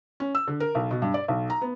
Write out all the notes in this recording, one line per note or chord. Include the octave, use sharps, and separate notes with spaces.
C#4
E6
D3
A#4
B1
B2
G2
D5
B1
A#5
B3